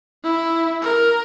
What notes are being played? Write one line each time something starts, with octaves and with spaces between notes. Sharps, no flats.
E4
A#4